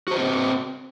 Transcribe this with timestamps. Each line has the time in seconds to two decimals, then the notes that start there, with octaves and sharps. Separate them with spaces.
0.08 F#4
0.11 C5
0.14 B4
0.18 C4